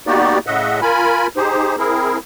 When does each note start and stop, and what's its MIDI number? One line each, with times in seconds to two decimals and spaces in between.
0.07 0.39 58
0.07 0.39 59
0.07 0.39 63
0.07 0.39 66
0.07 0.39 67
0.07 0.39 74
0.47 0.81 45
0.47 0.81 49
0.47 0.81 75
0.47 0.81 76
0.47 0.81 78
0.82 1.27 65
0.82 1.27 70
0.82 1.27 80
0.82 1.27 83
1.37 1.76 63
1.37 1.76 67
1.37 1.76 68
1.37 1.76 72
1.78 2.18 60
1.78 2.18 64
1.78 2.18 68
1.78 2.18 70